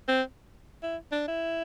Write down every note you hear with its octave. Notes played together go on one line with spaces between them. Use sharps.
C4
E4
D4
E4